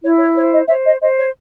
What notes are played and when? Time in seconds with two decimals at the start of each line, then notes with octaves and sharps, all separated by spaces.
0.02 E4 C#5
0.18 C#5
0.35 C5 C#5
0.52 D#5
0.68 C5 C#5 E5
0.84 D#5
1.01 C5 D#5
1.18 C#5